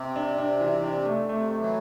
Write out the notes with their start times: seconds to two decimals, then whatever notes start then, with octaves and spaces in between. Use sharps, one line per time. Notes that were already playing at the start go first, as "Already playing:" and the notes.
Already playing: C3
0.16 D4
0.38 D4
0.61 E3
0.84 D4
1.06 A3
1.29 C3 A3
1.51 A3
1.58 E3 F#3